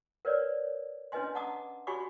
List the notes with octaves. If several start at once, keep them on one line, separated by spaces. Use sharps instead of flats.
A#4 B4 C#5 D5
C#4 D4 B4 D#5 G#5 C6
F#5 A5 A#5 D6 D#6
F#4 G4 G#5 B5 C#6 D6